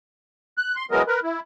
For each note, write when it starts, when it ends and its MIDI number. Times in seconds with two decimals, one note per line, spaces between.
0.58 0.75 90
0.76 0.86 84
0.91 1.02 52
0.91 1.02 54
0.91 1.02 56
0.91 1.02 59
0.91 1.02 70
0.91 1.02 75
1.07 1.20 70
1.07 1.20 71
1.24 1.40 64